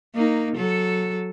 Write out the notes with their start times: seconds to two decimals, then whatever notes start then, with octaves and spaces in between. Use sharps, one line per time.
0.15 A#3 D#4
0.56 F#3 A4